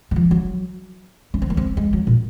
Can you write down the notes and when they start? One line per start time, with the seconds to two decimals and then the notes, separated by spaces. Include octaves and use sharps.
0.11 D#3
0.16 F3
0.31 F#3
1.34 C#4
1.42 C4
1.50 A#3
1.57 C4
1.77 G#3
1.93 F#3
2.07 A#2